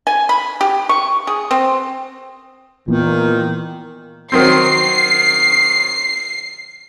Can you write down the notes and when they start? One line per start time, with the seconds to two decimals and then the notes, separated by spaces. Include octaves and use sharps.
0.07 G#5
0.29 B5
0.61 G4
0.89 C#6
1.27 G#4
1.51 C4
2.88 A#2 D#3 E3 B3
4.32 D#3 F#3 C4 C7